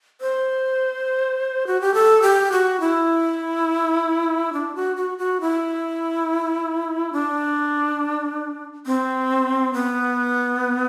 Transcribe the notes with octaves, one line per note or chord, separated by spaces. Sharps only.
C5
F#4
G4
A4
G4
F#4
E4
D4
F#4
F#4
F#4
E4
D4
C4
B3